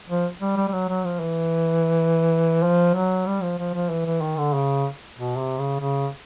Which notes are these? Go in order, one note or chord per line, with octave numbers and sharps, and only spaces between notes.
F3
G3
G3
G3
F#3
F#3
F3
E3
F3
F#3
G3
F3
F3
F3
E3
E3
D#3
D3
C#3
B2
C3
C#3
C#3